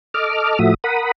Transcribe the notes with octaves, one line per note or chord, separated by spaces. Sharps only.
A4 D#5 D6 F6
A2 F3 A3 F#4 E5 D#6
A#4 F#5 B5 D#6